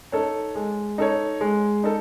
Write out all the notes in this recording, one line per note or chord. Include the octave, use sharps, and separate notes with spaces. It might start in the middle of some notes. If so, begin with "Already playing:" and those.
D#4 A4 C#5
G#3
D#4 A4 C#5
G#3
D#4 A4